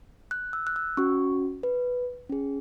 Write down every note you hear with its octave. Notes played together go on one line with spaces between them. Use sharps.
F#6
E6
F#6
E6
C#4 F#4 C#6
B4
C#4 G#4